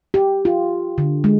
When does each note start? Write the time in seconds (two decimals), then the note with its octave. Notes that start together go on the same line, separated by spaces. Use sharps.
0.14 G4
0.45 F4
0.98 D3
1.24 G#3